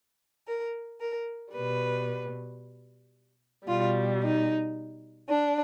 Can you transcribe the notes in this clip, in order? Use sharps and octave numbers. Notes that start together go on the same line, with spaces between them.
A#4
A#4
B2 G3 B4
B2 G3 F4
D#4
D4